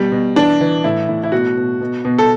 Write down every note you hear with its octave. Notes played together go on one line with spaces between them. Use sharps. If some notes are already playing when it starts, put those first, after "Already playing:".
Already playing: B2 G3
B2
E3 D4
E3
A2 E4
A2
E4
B2 F#4
B2
B2
B2
A4